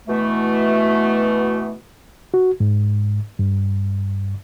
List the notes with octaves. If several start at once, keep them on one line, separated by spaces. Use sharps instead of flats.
B2 E3 A3
F#4
G#2
G2